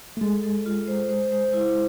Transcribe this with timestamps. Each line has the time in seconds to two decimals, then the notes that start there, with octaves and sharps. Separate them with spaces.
0.17 A3
0.21 G#3 A4
0.43 A4
0.66 F4
0.88 C5
1.09 C5
1.32 C5
1.53 E4